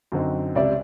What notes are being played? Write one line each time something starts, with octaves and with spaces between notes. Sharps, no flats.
F#2 D3 C4 D#4
C#2 C3 D5 E5